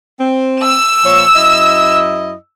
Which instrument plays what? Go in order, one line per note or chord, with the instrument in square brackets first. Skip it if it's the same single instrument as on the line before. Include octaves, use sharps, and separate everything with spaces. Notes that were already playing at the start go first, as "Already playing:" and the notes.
[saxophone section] C4
[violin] E6 E7
[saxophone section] A#2 F3 C#5
F#2 E4 D#5